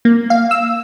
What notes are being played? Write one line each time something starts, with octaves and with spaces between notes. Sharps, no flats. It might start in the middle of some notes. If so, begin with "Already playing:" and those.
A#3
F5
E6